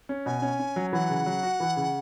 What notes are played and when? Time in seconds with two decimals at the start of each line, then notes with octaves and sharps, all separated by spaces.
0.09 C#4
0.26 B2 G#5
0.42 C#4
0.59 C#4
0.76 F#3
0.93 E3 F#5
1.10 C#3
1.26 F#3
1.43 F#4
1.60 E3
1.76 C#3